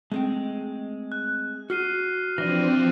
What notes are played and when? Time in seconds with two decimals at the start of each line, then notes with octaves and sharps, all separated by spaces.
0.12 G#3 A3 C4 G5
1.12 F#6
1.70 F#4 F6 C7 D#7
2.38 E3 F3 C4 D4 A#6 D#7